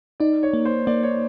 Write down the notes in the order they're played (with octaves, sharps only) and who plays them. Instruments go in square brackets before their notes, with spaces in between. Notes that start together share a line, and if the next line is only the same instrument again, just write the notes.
[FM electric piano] D#4 [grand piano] D5
[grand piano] C#5
[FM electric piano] A#3
[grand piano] C5
[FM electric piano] A#3 [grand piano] D5
[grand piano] C#5